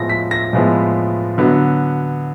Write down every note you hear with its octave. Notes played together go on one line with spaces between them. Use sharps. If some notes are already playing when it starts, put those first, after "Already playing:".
Already playing: A2 F3 G#3 B3 A#6
B6
A#6
A2 F3 G#3 B3
D3 F#3 B3